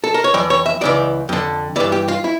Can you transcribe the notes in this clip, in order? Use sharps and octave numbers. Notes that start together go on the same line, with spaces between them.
A4
A#4
C#5
F2 E3 D5
C#5
E5
C#2 C#3 E3 D5
F2 D3
G2 E3 D5
G4
F4
E4